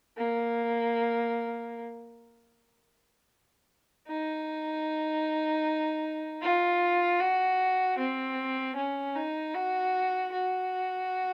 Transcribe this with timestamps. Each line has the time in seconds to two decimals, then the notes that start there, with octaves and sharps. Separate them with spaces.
0.17 A#3
4.07 D#4
6.42 F4
7.20 F#4
7.98 C4
8.76 C#4
9.16 D#4
9.55 F#4
10.32 F#4